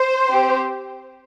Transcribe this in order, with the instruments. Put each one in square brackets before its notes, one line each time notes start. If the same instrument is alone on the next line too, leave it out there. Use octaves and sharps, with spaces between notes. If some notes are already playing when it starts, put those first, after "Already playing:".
Already playing: [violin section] C5
C4 G4